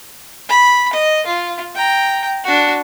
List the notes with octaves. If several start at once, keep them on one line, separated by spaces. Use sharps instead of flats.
B5
D#5
F4
G5 A#5
D4 F#4